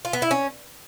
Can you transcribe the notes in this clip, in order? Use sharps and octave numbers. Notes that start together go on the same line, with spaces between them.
F4
B3
E4
C#4